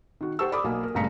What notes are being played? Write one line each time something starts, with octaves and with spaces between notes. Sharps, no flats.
D#3 F#4
G4 C5 F#5 A5 C#6 E6
D5 B5 D6 D#6
B1 A#3 G#5
A#4
G1 A2 C#3 A#5 B6 C#7